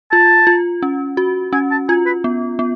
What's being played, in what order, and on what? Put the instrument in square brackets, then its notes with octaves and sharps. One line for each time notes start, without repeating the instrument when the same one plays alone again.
[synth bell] F4 [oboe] A5
[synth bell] F4
C#4
F#4
[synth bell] C#4 [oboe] G#5
[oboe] A5
[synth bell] F4 [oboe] G#5
[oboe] B4
[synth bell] B3
B3